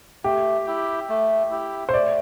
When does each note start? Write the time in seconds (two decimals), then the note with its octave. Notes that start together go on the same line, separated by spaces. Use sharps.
0.24 A3 G4
0.66 E4 G4
1.09 A3
1.50 E4 G4
1.89 C5
1.93 A3 D5